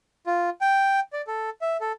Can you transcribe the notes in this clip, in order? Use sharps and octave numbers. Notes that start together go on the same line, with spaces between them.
F4
G5
D5
A4
E5
A4